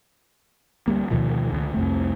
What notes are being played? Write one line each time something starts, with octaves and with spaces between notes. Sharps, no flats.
D2 G3 A#3
D2 B2 D#3 F3
C#2 D3
C2 F2 A3